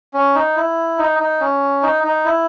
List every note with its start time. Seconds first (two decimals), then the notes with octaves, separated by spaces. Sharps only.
0.14 C#4
0.35 D#4
0.56 E4
0.98 D#4
1.20 D#4
1.40 C#4
1.83 D#4
2.04 D#4
2.25 E4